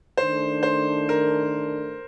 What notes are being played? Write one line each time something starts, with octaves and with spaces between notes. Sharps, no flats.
D#3 A3 D4 C5
C5
A#4